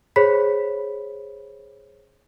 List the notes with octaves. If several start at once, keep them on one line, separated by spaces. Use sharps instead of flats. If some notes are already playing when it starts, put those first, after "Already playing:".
G#4 C5 C#5 B5 B6